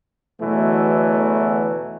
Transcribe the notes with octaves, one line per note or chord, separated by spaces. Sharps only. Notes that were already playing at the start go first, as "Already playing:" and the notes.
E2 B2 D3 E3 F#3 A3